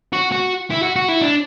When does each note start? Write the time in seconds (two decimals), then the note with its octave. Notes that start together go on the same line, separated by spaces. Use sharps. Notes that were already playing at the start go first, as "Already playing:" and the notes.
0.13 F#4
0.32 F#4
0.70 E4
0.83 F#4
0.96 F#4
1.09 E4
1.21 D4